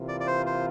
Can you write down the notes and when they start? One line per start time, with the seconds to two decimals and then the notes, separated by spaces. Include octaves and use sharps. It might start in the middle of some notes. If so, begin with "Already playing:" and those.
Already playing: C3 E3 A#3 F4
0.08 D5
0.20 D5
0.27 C5
0.46 C5